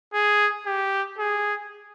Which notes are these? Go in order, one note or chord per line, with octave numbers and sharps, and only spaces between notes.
G#4
G4
G#4